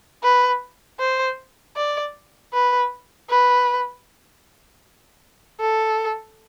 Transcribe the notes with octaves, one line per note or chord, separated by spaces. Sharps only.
B4
C5
D5
B4
B4
A4